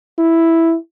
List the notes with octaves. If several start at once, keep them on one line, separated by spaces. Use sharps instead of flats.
E4